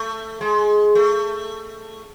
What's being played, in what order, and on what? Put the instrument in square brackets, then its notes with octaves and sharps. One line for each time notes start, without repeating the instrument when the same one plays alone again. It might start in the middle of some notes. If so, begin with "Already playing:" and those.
Already playing: [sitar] A3
G#3
A3